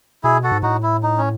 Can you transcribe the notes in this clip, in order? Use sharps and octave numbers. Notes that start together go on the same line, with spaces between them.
B2 E4 G#4
F#4 A4
G#2
A2 D#4 F#4
E4
D#4
C#4